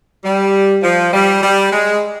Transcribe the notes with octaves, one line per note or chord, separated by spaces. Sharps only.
G3
F3
G3
G3
G#3